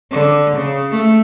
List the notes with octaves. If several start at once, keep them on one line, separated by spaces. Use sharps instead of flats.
D3
C#3
A3